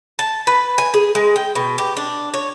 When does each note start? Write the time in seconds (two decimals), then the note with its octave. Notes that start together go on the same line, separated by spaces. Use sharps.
0.19 A5
0.47 B4
0.78 G#5
0.94 G#4
1.15 G#3
1.36 G5
1.55 B2
1.78 G4
1.97 D4
2.34 C#5